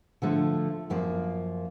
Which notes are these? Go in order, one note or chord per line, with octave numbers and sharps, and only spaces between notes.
D3 F3 A3
F#2 F3 A#3